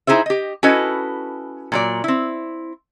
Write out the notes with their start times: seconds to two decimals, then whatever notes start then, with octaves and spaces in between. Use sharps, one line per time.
0.07 D#4 E4 G#4 C5 E5
0.26 G4 D#5
0.63 C#4 E4 F#4 A4 B4 D#5
1.72 A#2 F#3 D5
2.04 C4 E4